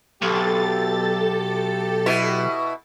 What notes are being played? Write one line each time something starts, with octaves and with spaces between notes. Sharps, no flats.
B1 G4 A4 A6
B2 E4